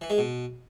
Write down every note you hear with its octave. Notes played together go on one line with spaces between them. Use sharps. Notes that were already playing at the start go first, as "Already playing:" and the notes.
E3
G#3
B2